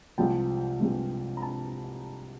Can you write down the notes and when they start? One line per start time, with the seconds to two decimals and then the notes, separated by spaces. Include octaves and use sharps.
0.18 C2 C3 F3 G#3 G5 A5
0.80 C2 C3 F3 G#3
1.37 A#5
1.42 A5 B5